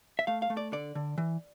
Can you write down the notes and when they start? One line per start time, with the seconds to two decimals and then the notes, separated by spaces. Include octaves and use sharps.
0.19 E5
0.27 A3 F5
0.42 F5
0.50 A3
0.57 D5
0.72 D3 D5
0.95 D3
1.18 E3